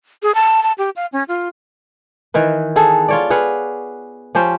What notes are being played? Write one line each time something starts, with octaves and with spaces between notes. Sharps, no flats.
G#4
A5
A5
G4
F5
C#4
F4
D#3 E3 B4
B3 G#4 A4
F4 C#5 D5
G#4 B4 F5 F#5
F3 C#4 G4 C5